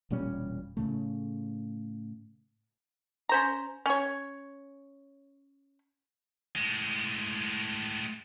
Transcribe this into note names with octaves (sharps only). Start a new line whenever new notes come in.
E1 A#2 G3 C#4
A2 C#3 A3
C#4 C5 A#5
C#4 C#5
A2 G#3